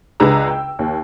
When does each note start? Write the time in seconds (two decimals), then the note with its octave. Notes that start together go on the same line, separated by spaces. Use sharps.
0.20 C#2 D4 G#4 B4 A#5 E6
0.48 G5
0.79 D#2